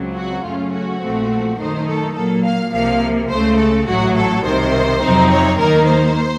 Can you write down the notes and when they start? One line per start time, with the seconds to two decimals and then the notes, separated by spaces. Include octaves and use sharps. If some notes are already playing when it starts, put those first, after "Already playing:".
Already playing: C#2 C#3 F#3 C4
0.15 F#4
0.44 F#2 C#3 A3 C#4 F4
0.72 F#4
1.01 A#1 A#2 F3 A3 C4
1.58 F#2 D#3 A3 D#4 C5
1.87 A4
2.15 A#2 F#3 A#3 A4
2.44 F5
2.72 C2 C3 F3 A#3 F5
3.30 C#2 C#3 A3 C5
3.57 A4
3.87 A1 A2 F#3 F#4
4.15 A4
4.43 C2 C3 D#3 C5
5.01 F2 C3 F#3 C4 D#4
5.29 C#5
5.58 D#2 D#3 A#3 D#4 A#4
5.86 C5